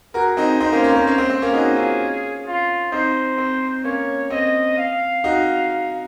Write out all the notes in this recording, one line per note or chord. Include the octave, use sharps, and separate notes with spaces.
F#4 G#4 A#4
C4 D#4
C4 D#4 C5
A#3 C#4
A#3 C#4
A#3 C#4
A#3 C#4
C4
C4
A#3 C#4
D#4 F#4 G#4
C#4 F4
F4
C4 D#4 C5
C4
A#3 C#4 C#5
C4 D#5
F5
D#4 F#4